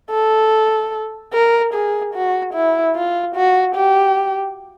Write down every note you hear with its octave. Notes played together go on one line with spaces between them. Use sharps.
A4
A#4
G#4
F#4
E4
F4
F#4
G4